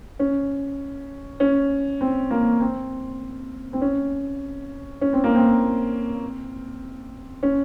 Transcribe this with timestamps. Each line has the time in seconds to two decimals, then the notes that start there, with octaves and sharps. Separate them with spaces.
0.19 C#4
1.40 C#4
2.01 C4
2.31 A#3
2.60 C4
3.73 C4
3.81 C#4
5.01 C#4
5.13 C4
5.24 A#3
5.35 C4
7.43 C#4